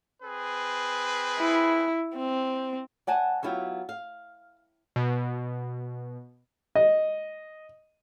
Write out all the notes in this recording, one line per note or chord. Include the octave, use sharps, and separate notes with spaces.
C4 G#4 B4
E4
C4
D5 F#5 G#5 A5
F#3 B3 E4 F4 G4
F5
B2
D#5